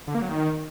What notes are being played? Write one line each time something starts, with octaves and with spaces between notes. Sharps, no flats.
D3
A#3
F#3
D#3